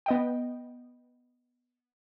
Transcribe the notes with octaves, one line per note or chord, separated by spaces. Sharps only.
B3 D#5 G5